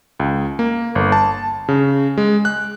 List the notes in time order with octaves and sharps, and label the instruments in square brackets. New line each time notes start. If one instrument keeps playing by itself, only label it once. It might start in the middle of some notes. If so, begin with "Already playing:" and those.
[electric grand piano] C#2
A#3
G1
A5
C#3
G#3
F#6